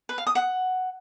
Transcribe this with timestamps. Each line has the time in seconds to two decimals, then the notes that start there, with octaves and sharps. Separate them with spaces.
0.09 B4
0.18 F5
0.27 D#6
0.35 F#5